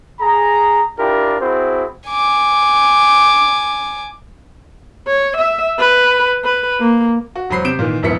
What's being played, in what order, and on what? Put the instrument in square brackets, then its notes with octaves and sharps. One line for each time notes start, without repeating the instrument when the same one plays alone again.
[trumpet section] G#4 A#5
D4 E4 F4 G4 A#4
C4 E4 F#4 G#4 C5
[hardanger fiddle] G#5 D6
[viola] C#5
E5
B4
B4
A#3
[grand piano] F#4
E1 F#3 C5 B5 C7
C3 G6 D7 E7
A#2 D#3 E3
E1 A#1 B3 E4 B6 C#7